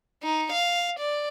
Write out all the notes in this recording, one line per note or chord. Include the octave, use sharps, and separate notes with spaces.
D#4
F5
D5